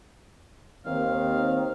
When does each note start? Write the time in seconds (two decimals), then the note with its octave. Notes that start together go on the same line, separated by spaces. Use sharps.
0.86 D#2 D#3 C4 F5